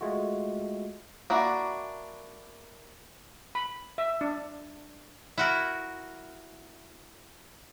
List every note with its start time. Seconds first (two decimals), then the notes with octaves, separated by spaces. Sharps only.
0.01 G#3 A3 F4 F#4
1.30 A#3 D4 E4 F#4
3.55 B5
3.98 E5
4.21 D4
5.38 E4 F#4 A#4